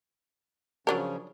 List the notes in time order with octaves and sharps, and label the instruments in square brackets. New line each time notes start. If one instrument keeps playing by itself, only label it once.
[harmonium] C#3 F3 C#4 [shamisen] F#3 D4 A#4